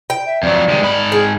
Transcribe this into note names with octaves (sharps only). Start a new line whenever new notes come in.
G5
E5
F2 F#3 D5
D#2 G#3
G#2 B5
G#4